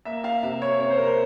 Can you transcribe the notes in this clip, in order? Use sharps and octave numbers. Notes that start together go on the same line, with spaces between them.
A#3 E5
F5
C3 E5
C#5
C3 C#5
C5
A#4
C5